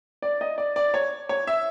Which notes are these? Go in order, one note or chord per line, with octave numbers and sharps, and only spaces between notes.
D5
D#5
D5
D5
C#5
C#5
E5